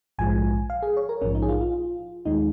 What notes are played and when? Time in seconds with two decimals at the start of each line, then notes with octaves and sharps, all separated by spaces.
0.18 A#1 G#2 F3 G#3 G#5
0.70 F5
0.83 G#4
0.97 C#5
1.09 A#4
1.21 A#1 G#2 F3 C#4
1.35 D#4
1.42 G#4
1.49 F4
1.61 F4
2.25 D#2 D#3 G#3 D#4